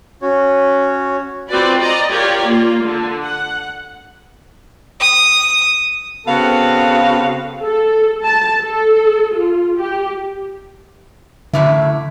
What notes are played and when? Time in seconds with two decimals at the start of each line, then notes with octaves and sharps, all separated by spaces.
0.22 C#4 F#4 C#5
1.50 C4 F4 F#4 B4 D5
1.80 D5 D#5 A#5
2.11 F4 G4 A#4 C#5 D5
2.48 A#3 F4
2.85 D3
3.22 F#5
5.01 D#6
6.27 C#3 B3 C4 F#4 A4 F5
7.63 A4
8.23 A5
8.61 A4
9.36 F4
9.77 G4
11.53 F#2 A2 D3 E5 D6